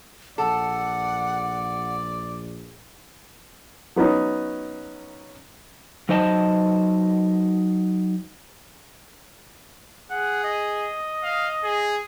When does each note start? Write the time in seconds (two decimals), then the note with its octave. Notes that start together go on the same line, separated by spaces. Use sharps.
0.38 A#1 A4 D5 F#5
3.96 F#3 B3 C#4 D#4
6.09 F#3 D#4 C5 D#5 G#5 A5
10.11 G#4 F#5
10.44 D#5
11.23 F5
11.64 G#4